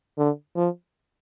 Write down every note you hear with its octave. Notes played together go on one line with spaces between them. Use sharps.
D3
F3